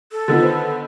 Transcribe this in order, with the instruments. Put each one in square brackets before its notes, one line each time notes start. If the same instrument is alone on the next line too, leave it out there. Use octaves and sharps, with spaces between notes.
[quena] A4
[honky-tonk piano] D3 D#3 B3 [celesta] F4 E6 A6
[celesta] B4 C5